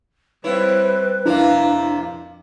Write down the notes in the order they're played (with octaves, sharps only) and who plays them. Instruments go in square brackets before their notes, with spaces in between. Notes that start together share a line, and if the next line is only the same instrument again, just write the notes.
[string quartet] G3 C4 [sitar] E4 C#5 [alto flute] B4
[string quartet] F2 [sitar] C3 F3 A#3 [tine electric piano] D4 E4